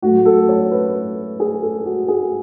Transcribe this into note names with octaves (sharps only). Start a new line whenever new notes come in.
A2 F#3 F#4
A4
C#5
B4
G#4
A4
F#4
G#4